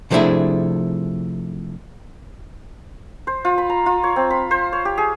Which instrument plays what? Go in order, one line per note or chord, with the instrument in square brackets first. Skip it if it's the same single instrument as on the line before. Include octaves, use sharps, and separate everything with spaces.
[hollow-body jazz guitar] C3 F3 A3 D4 E4 G#4
[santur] C5
F4
B5
A#5
F4
C#5
C4
B5
C5
C#5
G4
G#4